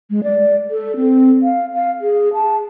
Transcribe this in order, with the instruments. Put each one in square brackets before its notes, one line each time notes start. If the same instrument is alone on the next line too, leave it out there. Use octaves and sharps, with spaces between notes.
[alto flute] G#3
D5
A4
C4
F5
F5
G#4
A5